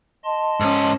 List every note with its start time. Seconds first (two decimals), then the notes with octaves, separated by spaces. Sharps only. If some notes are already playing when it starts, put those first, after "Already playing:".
0.24 D#5 A5 C6
0.60 G#2 C#4